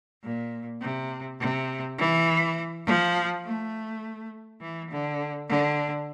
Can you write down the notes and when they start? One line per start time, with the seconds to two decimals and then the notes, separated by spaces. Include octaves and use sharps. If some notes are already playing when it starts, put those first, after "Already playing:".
0.23 A#2
0.81 C3
1.40 C3
1.98 E3
2.86 F3
3.45 A3
4.61 E3
4.90 D3
5.49 D3